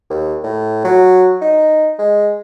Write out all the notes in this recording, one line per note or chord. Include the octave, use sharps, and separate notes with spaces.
D#2
A2
F#3
D#4
G#3